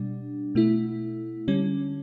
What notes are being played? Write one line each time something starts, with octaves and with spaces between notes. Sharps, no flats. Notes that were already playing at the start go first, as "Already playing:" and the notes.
Already playing: B2 G3 D4
B2 A3 E4
D3 G3 C#4